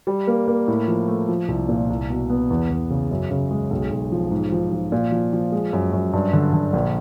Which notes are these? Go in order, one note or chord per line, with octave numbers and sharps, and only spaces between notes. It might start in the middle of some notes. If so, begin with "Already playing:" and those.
G3
A#3
A#3
A2
F3
A3
F3
C2
A#2
C2
B2
B3
E2
E2
C#3
F#2
C#3
G#3
B1
B1
F3
G#2
F3
F3
A#2
F3
F3
G#3
F#2
F#2
G2
D3
D3
A#1